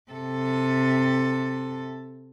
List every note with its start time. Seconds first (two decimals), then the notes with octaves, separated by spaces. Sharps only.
0.11 C3 A4